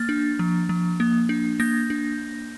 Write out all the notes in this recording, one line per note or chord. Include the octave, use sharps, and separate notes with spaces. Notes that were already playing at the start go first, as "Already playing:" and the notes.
Already playing: A#3 F6 A6
D4
F3
F3
A#3
D4
A#3 G6 A#6
D4